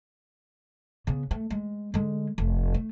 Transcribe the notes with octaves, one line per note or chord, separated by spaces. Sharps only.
C#3 B3
A3
G#3
D3 G#3
F1
A3